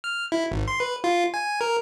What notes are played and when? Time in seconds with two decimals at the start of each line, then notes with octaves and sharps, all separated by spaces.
0.04 F6
0.32 E4
0.52 G#1
0.68 C6
0.80 B4
1.04 F4
1.34 G#5
1.61 A#4